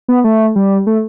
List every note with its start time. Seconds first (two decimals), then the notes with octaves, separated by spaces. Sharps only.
0.08 B3
0.24 A3
0.56 G3
0.87 A3